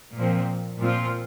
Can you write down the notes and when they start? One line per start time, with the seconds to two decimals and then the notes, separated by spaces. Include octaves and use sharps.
0.18 A#2 F3 C4
0.83 A#2 F3 C4 F4